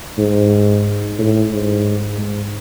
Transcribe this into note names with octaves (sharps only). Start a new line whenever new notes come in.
G#2
A2
G#2
G#2